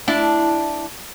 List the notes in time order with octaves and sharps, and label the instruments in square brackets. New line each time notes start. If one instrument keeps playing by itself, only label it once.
[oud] D4 E4